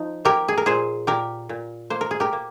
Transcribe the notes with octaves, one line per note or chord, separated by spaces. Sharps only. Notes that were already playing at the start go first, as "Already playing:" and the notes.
Already playing: F3 D#4
A#3 G4 A#4
G#4
A#4
A#2 G#4 C5
A#2 G4 A#4
A#2
A#3 C5
A#4
G#4
G4 A#4
A#3